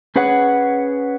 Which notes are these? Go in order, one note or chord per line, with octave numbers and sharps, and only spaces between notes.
C#4 G#4 B4 C#5 F#5